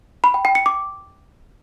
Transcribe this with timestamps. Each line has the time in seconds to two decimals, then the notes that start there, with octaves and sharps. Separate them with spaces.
0.24 B5
0.34 G5
0.45 G5
0.55 C#7
0.66 D6